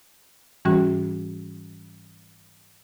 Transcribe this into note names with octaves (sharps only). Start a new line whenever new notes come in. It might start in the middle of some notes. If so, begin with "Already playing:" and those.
G#2 E3 G3 C#4 F#4